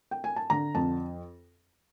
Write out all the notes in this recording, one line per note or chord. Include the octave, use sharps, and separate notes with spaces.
G5
G#5
A5
D3 A#5
F2 A5